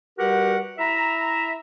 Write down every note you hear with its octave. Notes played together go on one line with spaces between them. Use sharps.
G3 F#4 G4 A#4 B4 F#5
E4 E5 A#5